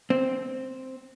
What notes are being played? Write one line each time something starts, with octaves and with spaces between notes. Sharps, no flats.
C4